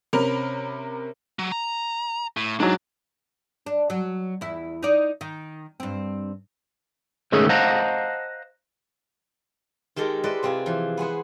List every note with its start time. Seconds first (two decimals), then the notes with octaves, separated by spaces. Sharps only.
0.13 C3 C#4 A#4 B5 F7
1.39 F#3
1.52 A#5
2.37 A2
2.60 G#2 F#3 D4
3.66 D4
3.90 F#3
4.41 E2 E4
4.83 D#4 D5
5.21 D#3
5.80 G2 C4
7.32 C#2 G#2 D#3 A3 C#4 G#4
7.49 C5 D#5 F5 F#5 A5 A#5
9.96 D#3 G#3 G4 A4 A#4
10.24 E4 A4 B4 C5 D5 D#5
10.43 C3 C4 F4 G#4
10.66 E3 F3
10.97 B3 G#4 C5 F#5